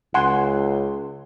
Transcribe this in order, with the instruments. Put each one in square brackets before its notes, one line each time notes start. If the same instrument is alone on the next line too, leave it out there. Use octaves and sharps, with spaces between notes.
[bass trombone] C#2 [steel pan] F#5 G#5 C6